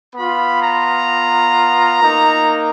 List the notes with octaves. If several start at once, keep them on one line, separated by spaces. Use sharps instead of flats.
B3 F4 B5
A#5
A#3 D#4